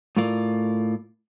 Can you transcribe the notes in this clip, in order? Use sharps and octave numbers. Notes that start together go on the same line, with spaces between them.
A2 A3 F4 A#4 D5